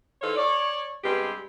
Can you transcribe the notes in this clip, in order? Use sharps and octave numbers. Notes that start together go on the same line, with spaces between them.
E3 D#4 A4 C5 C#5 F5
C#5 D5
G2 G#3 B3 C4 G4